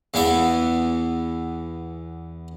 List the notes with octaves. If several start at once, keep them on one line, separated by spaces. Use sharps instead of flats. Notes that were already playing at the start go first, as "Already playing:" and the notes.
E2 E3 B3 E5